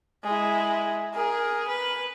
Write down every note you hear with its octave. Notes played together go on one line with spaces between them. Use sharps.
G#3 E4
G#4 A#4
B4